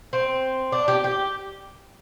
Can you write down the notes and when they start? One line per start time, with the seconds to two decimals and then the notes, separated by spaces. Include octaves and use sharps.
0.13 C4
0.72 D4
0.88 G4
1.04 G4